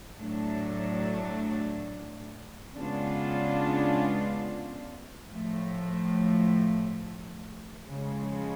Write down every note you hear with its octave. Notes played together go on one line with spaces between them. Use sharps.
A2 F#3 A3 D4
C#3 G#3 B3 D4 F4
A2 F3 A3
C#3 F3 G#3